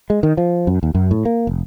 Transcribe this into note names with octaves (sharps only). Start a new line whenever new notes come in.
G#3
D#3
F3
F#2
D#2
F#2
A2
A#3
F1